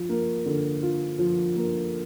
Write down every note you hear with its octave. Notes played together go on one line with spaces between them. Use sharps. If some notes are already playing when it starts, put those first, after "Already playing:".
Already playing: F3
A#3
D3
F4
F3
A#3